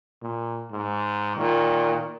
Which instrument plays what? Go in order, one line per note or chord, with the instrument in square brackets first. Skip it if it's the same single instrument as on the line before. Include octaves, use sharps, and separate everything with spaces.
[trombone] A#2
G#2
[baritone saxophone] A#2 [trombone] D#3